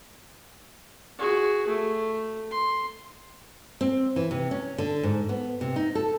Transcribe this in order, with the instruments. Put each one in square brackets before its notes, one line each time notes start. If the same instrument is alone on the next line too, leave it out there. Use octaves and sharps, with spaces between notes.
[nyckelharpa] F#4 G#4
A3
C6
[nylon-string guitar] C4
E3
C3
C#4
D3
G#2
B3
C3
D#4
A4